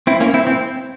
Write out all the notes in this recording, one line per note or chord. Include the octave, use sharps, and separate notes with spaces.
C4 E4
A#3 C#4
C4 E4
C4